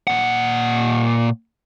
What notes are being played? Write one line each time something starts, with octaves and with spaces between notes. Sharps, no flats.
A#2 F#5